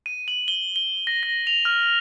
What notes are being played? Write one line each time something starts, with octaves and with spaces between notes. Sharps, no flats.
D#7
F#7
G7
G7
A#6
A#6
F7
F6